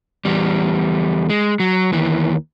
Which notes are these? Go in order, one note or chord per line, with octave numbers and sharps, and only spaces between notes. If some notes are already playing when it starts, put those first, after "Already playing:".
E2 G3
G#3
F#3
D#2 E3